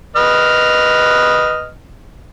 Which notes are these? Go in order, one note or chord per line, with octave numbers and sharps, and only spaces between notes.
B4 D#5 F6